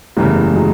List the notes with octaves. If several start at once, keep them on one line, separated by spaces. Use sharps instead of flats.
F#1 E2 C#3 G3 A3
F#3 G#3